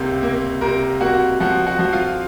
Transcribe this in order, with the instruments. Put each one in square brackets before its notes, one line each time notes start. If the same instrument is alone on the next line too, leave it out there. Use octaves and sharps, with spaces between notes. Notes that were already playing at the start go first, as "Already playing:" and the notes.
Already playing: [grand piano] C#2 C3 A#3
A#3
C3 A#4 A#5
A#3 F#4 F#5
F3 F#4 F#5
F#4 F#5
F3
F4 F5